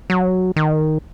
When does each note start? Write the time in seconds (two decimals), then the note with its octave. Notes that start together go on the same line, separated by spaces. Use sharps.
0.10 F#3
0.56 D#3